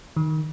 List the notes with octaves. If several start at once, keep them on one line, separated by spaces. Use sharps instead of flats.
D#3